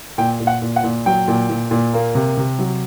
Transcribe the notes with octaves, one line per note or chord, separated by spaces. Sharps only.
A#2 G5
A#2
F#5
A#2
F#5
A#2
F#3 G5
A#2
A#2
A#2
A#3
C3
C3
F#3